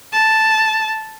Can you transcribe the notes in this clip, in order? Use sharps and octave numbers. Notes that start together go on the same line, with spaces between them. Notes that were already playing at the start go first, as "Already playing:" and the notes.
A5